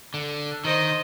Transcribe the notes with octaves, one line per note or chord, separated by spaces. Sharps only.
D3
D#3 C5 D#5